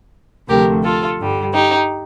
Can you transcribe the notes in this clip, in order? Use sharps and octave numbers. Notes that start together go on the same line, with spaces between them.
D2 C3 F3 A3 G4 A#4
F4 A4
G2 D3 G3
D#4 G4